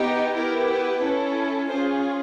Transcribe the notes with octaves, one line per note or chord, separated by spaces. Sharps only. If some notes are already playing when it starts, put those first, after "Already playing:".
Already playing: B3 D#4 G4
B3 E4 G4 A#4
B4
C#4 E4 A4
C#4 F4 G#4 C5